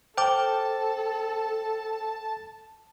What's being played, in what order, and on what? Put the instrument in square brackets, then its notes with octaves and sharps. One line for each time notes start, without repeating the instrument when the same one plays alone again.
[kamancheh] A4 [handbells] C5 D6 [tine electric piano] G5 [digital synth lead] A5